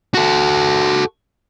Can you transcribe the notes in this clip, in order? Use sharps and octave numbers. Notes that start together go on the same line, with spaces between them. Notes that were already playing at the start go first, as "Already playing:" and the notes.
F#4 A4